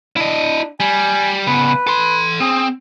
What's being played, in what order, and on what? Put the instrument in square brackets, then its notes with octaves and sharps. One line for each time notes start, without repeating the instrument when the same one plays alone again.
[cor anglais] D4 [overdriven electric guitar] E4 D#5
[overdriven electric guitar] G3 [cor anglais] G#5
[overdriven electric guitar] C#3 B3 [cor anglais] B4
[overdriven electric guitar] A4 C6
[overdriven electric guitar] C4 [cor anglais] G#4